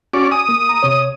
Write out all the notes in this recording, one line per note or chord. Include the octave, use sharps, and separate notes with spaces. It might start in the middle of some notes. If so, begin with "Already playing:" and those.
C#4 F#4 D5
G#5 D#6
A#3
A#5
C3 C#5